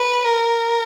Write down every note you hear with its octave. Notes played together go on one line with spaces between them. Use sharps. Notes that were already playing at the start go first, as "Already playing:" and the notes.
Already playing: B4
A#4